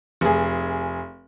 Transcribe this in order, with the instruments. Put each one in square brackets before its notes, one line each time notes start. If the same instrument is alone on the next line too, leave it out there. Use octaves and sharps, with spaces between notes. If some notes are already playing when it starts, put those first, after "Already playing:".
[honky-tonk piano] F1 G#4